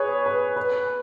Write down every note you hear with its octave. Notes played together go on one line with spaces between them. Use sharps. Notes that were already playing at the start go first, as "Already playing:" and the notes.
Already playing: G#4 B4 C#5
B4
B4